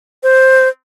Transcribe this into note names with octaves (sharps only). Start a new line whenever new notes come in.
C5